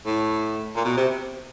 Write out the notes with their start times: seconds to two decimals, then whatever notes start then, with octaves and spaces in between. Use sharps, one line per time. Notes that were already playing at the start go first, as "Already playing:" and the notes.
0.06 A2
0.76 A#2
0.85 B2
0.97 C3